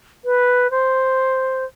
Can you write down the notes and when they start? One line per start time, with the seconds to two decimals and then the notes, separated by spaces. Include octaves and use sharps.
0.24 B4
0.70 C5